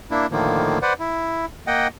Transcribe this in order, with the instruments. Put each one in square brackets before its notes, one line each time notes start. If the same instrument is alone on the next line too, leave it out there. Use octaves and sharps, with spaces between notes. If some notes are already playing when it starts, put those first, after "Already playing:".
[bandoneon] A#3 D4 E4
A2 D3 D#3 F3 A#3
B4 C5 D5 F#5
E4
A#3 D#5 F#5 G5